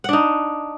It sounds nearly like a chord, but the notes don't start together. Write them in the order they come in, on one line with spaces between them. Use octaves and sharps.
F#5 D4 D#4